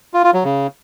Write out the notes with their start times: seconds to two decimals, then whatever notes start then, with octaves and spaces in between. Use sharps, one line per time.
0.14 F4
0.24 F4
0.34 F#3
0.44 C#3